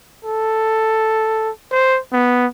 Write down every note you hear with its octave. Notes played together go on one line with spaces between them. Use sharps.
A4
C5
B3